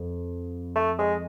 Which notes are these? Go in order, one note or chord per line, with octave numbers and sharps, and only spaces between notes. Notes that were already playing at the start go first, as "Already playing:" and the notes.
Already playing: F2
A3
G#3